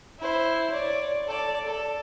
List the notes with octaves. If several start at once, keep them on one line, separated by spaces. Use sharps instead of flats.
E4 C5
C#5 D5
A4 D5
A4